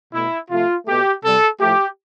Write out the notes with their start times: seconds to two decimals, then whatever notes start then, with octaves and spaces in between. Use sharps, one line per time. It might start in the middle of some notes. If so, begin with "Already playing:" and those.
0.13 B2 A3 E4
0.50 C3 F3 A3 F4
0.86 B2 A3 G4
1.23 C3 G3 A4
1.60 A2 F3 A3 G4